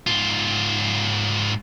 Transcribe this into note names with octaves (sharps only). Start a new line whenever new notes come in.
G#2 F4